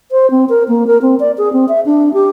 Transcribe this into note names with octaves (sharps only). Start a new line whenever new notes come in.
C5
C4
A#4
A#3
A#4
C4
D5
G#4
C4
E5
D4
G4